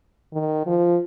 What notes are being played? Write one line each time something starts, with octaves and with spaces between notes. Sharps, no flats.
D#3
F3